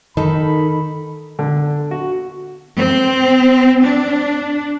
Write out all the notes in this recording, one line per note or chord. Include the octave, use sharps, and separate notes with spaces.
D#3 D#4 A4 B5
D3
F#4
C4
D4